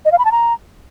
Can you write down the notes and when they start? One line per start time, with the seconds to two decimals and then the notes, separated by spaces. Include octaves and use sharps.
0.05 D#5
0.12 F5
0.18 B5
0.25 A5
0.32 A#5